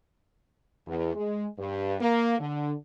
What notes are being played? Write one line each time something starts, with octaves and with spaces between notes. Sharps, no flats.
E2
G#3
G2
A#3
D3